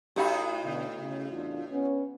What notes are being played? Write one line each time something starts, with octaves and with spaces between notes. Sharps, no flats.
A2 D#4 F#4 G4 F5 B5
B2 D3
C#3
E2 D4 F4
B3 C#4